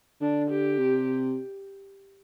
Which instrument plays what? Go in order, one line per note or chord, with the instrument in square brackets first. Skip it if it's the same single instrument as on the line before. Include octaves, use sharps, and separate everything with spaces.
[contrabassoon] D3 [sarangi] D4
[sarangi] G4
[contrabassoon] C3